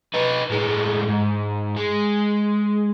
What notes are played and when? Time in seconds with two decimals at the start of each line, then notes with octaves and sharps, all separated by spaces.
0.14 D#4 B4
0.51 A2 G#3
1.09 G#2
1.77 G#3